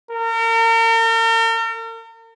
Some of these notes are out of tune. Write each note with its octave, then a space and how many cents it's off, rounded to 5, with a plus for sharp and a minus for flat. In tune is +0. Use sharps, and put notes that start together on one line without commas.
A#4 -40